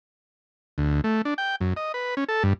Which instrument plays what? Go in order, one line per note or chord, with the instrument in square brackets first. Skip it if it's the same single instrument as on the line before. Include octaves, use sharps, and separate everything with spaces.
[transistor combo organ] D2
A3
D4
G5
F#2
D#5
B4
C#4
A4
G2